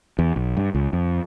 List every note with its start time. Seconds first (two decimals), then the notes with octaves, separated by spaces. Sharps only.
0.19 E2
0.36 B1
0.57 G2
0.75 C#2
0.93 F2